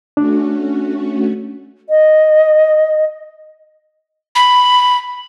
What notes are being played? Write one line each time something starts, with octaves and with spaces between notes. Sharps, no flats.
A3 C#4 D4 F#4
D#5
B5